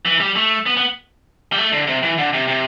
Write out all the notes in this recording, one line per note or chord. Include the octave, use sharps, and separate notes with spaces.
E3
G3
A3
B3
B3
G3
A3
D3
C3
E3
D3
C3
C3